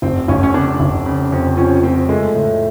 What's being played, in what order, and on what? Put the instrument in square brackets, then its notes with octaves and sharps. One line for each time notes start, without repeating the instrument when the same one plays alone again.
[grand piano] F1 [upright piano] C4
[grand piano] F1 [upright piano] C#4
[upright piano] C#4
[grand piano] C#3 [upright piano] D4
[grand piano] F1
C#3
F2
[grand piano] F3 [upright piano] C#4
[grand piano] F3 [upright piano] C4
[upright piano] G#3 [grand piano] A3
[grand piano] A2